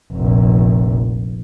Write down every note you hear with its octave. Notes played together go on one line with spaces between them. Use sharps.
F1 A#1